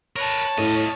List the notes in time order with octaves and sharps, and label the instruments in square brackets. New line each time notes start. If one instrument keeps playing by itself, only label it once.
[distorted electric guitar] A#4 B4 [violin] C#5 A5
[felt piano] A2 [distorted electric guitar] F4 D#5